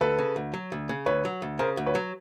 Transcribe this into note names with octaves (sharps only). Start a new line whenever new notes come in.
D2 A4 B4
C#3
D2
F#3
D2
C#3
D2 B4 C#5
F#3
D2
C#3 A#4 C5
D2
B4 C#5
F#3